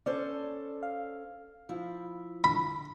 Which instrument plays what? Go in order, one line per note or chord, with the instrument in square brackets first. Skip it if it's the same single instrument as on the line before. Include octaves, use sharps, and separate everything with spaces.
[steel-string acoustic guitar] C#4 A4 C5 [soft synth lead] D5
[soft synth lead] F5
[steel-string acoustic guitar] F3 E4
[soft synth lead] D3 [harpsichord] B5